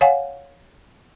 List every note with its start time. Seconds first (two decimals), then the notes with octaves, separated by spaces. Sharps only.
0.01 C#5 F5 F#5 G#5